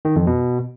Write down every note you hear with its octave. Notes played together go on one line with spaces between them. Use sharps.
D#3
F2
B2